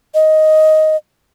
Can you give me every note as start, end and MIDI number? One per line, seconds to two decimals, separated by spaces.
0.14 0.96 75